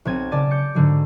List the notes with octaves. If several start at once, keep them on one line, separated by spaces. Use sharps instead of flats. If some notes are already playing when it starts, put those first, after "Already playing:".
B1 C4 G#6 D#7
C#3 D5 A5 D#7
D6 G6 C#7
G#2 D3 F#3